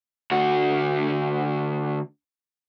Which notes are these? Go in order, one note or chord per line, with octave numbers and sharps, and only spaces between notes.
D2 F#4